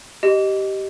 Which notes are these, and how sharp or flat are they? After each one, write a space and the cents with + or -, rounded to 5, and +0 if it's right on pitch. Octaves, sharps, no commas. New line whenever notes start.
G4 -15 D#5 +0